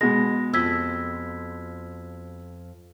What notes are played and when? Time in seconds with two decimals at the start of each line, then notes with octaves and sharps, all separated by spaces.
0.01 B2 G#3 A#6
0.54 F2 E6 G#6 B6